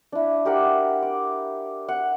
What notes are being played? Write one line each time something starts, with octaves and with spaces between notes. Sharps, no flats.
D4 E4
G4 A#4 F#5
D6
F#5